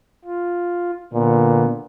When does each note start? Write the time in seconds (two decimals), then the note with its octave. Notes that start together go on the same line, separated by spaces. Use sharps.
0.25 F4
1.13 A#2 D3 B3